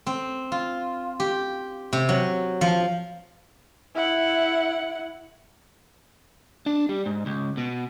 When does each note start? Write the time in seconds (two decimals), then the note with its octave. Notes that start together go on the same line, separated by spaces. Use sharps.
0.07 C4
0.52 F4
1.20 G4
1.93 C3
2.09 F#3
2.61 F3
3.95 E4 F#5
6.66 D4
6.89 G3
7.06 G#2
7.26 C#2
7.57 B2